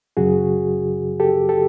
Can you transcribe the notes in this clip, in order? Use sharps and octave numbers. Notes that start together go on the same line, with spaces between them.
F#2 C#3 F#3 F#4 G#4
G4 A4
G4 A4